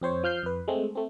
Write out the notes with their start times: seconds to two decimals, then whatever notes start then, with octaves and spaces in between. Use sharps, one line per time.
0.01 F2 C4 C5 C#5
0.23 F3 F6 G6 C7
0.43 F2 B4
0.68 G#3 A3 C4
0.95 A3 C4